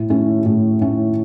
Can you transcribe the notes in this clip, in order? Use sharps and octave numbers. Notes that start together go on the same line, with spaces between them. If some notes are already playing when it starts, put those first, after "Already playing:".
Already playing: A2
A3 C#4 E4
A2
A3 C#4 E4